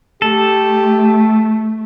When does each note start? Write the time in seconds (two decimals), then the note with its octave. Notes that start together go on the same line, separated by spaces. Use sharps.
0.22 A3 G4 A4